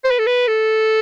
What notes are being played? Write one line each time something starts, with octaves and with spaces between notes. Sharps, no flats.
C5
B4
A4
B4
A4